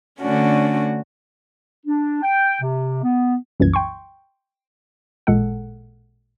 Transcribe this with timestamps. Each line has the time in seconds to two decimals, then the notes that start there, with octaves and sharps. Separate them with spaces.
0.21 D3 A3 C#4 D4 F#4
1.86 D4
2.22 G5
2.61 C3
3.02 B3
3.60 C2 F#2 A#2 E3 G#6
3.73 G5 C6 C#6
5.27 A1 A#2 G#3 A4 F#5